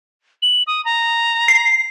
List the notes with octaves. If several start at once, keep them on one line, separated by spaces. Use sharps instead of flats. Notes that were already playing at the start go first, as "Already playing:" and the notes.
F#7
D#6
A#5
C7